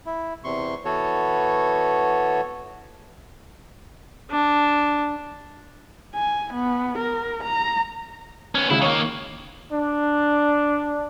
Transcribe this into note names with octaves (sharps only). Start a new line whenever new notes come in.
E4
E2 C3 C6 C#6
E3 B3 F#4 A4 C#5
D4
G#5
B3
A#4
A#5
B3 C#4
C#2 C#3 E4
D#3 A#3 C#5 C#6
D4